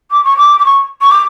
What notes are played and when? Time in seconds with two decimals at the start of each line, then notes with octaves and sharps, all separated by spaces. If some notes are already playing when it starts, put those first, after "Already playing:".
0.11 D6
0.24 C#6
0.37 D6
0.59 D6
0.65 C#6
1.01 C#6
1.10 D6